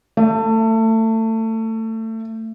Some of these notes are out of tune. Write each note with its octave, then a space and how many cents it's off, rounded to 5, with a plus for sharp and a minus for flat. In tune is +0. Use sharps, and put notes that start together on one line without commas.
A3 +25